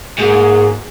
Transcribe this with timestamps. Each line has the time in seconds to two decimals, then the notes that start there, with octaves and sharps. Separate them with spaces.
0.18 G#2 A#3 F#4 G#4